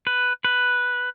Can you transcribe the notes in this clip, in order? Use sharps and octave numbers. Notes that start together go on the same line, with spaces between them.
B4
B4